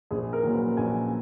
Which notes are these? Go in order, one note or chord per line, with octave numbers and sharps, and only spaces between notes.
A#1 G#4
A#4
A#2 F#3
B4
A#1 G#5